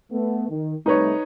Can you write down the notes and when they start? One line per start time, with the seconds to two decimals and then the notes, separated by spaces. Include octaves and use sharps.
0.11 A3 B3
0.49 D#3
0.86 C3 G3 A3 D#4 B4 C#5